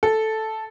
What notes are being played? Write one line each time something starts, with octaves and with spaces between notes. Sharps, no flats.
A4